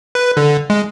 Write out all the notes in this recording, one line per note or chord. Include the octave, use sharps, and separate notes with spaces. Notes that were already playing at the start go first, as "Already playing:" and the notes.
B4
D3
G#3